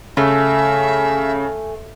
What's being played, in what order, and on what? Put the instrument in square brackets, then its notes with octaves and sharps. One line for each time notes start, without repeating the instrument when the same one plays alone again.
[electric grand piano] C#3 [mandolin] A3 [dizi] E5 [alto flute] G#5